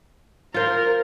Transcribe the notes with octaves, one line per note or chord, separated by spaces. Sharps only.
F4 A#4 C5